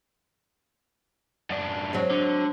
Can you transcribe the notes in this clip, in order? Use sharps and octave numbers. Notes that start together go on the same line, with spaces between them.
F#2 D4
F#3 G#3 C4
D3